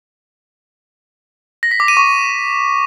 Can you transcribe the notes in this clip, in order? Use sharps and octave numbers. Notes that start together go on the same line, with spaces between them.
A#6
B6
D6
D#7
C#6